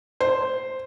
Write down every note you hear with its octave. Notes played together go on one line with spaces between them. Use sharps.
C5